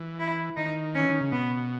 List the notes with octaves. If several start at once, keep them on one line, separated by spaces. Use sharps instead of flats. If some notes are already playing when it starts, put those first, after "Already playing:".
Already playing: E3
E4
D#3 D#4
E3 C#4
D#3
C#3
B2 B3